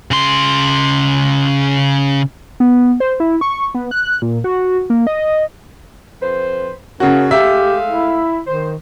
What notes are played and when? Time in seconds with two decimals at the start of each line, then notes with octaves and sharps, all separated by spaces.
0.11 C#3 C6
2.60 B3
3.00 C5
3.20 E4
3.41 C#6
3.75 B3
3.91 F#6
4.22 A#2
4.44 F#4
4.90 A#3
5.07 D#5
6.22 F2 B4 C5
7.00 C#3 A#3 C#4 F#4
7.31 G#3 A3 G4 E5 F5
7.88 E4
8.47 D#3 C5